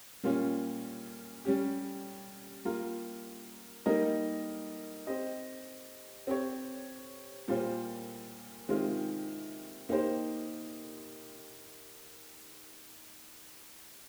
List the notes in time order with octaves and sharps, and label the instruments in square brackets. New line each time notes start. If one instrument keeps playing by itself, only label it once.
[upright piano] A#2 G3 A#3 C#4 F4
G3 C#4 G4
G3 A#3 F4 A#4
G3 A#3 D#4 A#4 D#5
C4 G4 C5 D#5
C4 G4 C#5
A#2 G3 A#3 F4 C5
C3 D#3 G#3 C4 F4
A#3 D#4 G4 C5